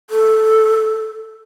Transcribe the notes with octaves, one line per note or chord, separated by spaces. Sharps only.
A4